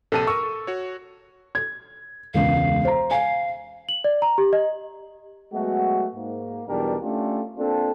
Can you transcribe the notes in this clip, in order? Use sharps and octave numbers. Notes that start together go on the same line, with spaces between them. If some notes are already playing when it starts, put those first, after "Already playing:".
A#1 C3 A4 A5 D#7
A#4 C#6 E6
A4
F#4 C#5
G#6
E1 C#2 F5
C5 A#5
F5 G#5
F#7
D5
A#5
G4
D#5
F#3 G#3 A3 B3 F#4
G#2 A#3
B1 E2 B2 G3 D4 A#4
A3 C#4 D4 F4 G4 A4
A#3 C4 D4 F4 A4